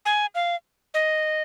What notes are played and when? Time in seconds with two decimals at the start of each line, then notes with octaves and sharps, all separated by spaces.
0.06 G#5
0.35 F5
0.94 D#5